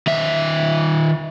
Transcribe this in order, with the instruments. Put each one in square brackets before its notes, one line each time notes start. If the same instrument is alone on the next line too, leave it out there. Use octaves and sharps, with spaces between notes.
[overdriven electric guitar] D#3 E5